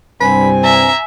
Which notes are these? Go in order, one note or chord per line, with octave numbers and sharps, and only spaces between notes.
C2 G2 C4 G#5 B5
E5 A#5